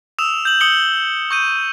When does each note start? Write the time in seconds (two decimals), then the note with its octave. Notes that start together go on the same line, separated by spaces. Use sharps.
0.19 D#6 E6 E7 F7
0.45 G6 F#7
0.60 D#6 C#7 F#7 G7
1.31 C#6 G6 D#7